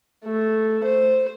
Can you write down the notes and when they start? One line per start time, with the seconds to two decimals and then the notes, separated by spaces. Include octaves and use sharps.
0.24 A3
0.83 C5